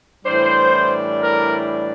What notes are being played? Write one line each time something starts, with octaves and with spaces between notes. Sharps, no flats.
A2 E3 G3 D4 C5
A#4